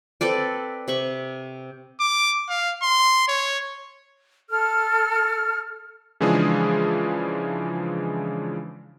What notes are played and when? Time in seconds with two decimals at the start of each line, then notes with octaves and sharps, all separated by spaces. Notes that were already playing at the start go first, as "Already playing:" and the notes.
0.21 C4 A4 B4 D5
0.88 C3 B5 C#6
2.00 D6
2.49 F5
2.82 C6
3.28 C#5
4.49 A4 F6
6.20 C#3 E3 F3 G#3 D4 G#4